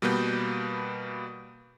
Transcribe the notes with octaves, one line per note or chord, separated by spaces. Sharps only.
B2 G3 A#3 B3 B4 G6